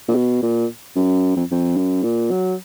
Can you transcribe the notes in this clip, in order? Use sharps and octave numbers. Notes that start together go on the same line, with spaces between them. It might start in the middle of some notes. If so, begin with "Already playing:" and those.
A#2
B2
A#2
F#2
F2
F2
F#2
A#2
F#3